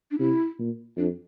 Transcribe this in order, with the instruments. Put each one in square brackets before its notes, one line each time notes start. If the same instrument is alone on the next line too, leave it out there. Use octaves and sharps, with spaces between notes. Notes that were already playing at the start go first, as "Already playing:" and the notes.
[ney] D4
[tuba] C3 [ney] E4
[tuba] A#2
[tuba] F2 [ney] D4